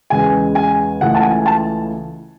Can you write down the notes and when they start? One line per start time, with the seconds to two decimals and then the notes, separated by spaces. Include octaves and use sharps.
0.10 E2 C#3 G#3 G#5
0.55 G#5
1.01 C#2 C#3 E3 A3 F#5
1.15 A5
1.23 G#5
1.46 A5